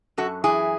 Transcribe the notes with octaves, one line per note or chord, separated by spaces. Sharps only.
F#2 F#4 A4
E3 E4 G#4